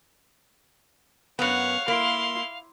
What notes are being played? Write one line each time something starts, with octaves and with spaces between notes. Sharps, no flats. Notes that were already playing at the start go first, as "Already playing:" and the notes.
F#2 B3 C#5 F5 F#5
A#3 E4 C6